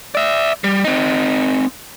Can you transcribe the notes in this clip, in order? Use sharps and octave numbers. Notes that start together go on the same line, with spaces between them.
D5 E5
G3
C4 D#4